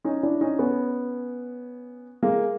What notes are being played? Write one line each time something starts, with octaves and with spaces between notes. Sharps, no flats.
C#4 D#4
D4 E4
C#4 D#4
B3 C#4
G#3 A#3